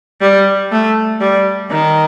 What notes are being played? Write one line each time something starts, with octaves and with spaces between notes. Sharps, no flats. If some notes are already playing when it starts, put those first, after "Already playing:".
G3
A3
G3
D#3